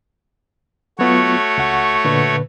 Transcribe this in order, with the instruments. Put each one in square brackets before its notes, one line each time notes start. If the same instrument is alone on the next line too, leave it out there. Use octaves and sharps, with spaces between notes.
[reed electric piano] F#3 B3 F4 [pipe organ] A3 F#4 C#5
[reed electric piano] C#2 F#5
A#2 D3 B4